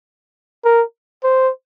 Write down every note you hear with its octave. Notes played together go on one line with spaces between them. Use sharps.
A#4
C5